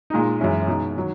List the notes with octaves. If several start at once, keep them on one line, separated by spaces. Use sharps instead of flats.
A#2 G#3 D#4
F#2 E3 G#3 C#4 E4
B2 G#3 D#4
D#3 F#3